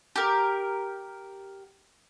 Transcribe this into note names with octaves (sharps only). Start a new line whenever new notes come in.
G4 A#4